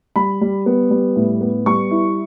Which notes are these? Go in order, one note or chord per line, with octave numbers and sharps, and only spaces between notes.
G3 B5
G3
B3
G3
A2
B3
G3 C#6
E4